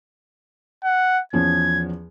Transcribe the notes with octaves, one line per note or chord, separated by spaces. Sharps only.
F#5
E2 F3 C#4 G#6